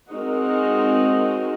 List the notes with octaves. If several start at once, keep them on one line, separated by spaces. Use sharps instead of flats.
G#3 C4 D#4 F#4 A#4